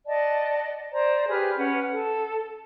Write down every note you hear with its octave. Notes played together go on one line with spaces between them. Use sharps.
D5 D#5 F#5 A5
C5 D5 A#5
G4 G#4 B4 F6
C#4 B4 F#5
A4